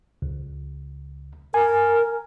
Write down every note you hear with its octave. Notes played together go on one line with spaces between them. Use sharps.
C#2
A#4 G#5